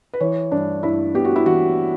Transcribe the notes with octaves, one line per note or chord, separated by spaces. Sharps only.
B4
E3 C#5
G2 D4
G2 E4
B3 G4
F#4
E4
E3 F#4